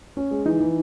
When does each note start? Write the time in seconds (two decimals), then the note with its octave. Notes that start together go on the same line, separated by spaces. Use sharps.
0.17 C#4
0.31 G#3
0.45 E3 D#4
0.60 E3